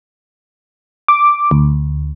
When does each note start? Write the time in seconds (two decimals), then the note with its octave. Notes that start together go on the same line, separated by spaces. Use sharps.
1.08 D6
1.51 D2